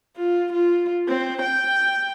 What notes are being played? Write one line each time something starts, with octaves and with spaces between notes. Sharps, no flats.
F4
F4
C4
G5